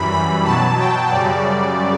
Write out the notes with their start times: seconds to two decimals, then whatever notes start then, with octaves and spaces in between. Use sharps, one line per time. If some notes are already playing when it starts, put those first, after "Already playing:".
Already playing: F#2 E3 G3 B5
0.12 B5
0.44 B2 F#3 A5
0.77 G5
1.10 F#2 C#3 G3 D5